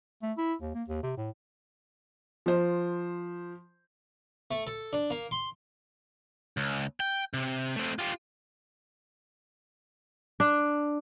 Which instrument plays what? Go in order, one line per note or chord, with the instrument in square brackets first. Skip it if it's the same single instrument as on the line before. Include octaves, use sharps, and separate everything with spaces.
[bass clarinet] A3
E4
D#2
A#3
D#2
C3
A2
[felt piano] F3 C5
[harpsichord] A3
A4
D4
A#3
C6
[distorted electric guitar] C#2
G5
C3
A3 C4
F4 G4
[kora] D4